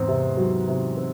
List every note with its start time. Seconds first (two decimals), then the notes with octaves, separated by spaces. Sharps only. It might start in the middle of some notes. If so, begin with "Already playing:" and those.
Already playing: E2 G#2 C4
0.08 C3
0.37 F#3
0.68 C3
0.97 C4